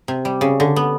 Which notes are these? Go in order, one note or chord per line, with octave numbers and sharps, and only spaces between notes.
C3
G3
C#3
D3
B3